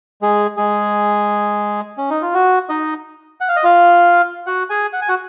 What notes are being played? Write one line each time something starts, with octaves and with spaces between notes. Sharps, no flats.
G#3 G#4
G#3 G#4
C#4
D#4
F4
F#4
D#4 D#5
F#5
F5
D#5
F4 F5
F#4 F#5
G#4 G#5
F#5
G#5
F#4 F#5